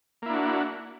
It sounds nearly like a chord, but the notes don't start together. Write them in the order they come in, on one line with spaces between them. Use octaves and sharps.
A#3 E4 D4 F#4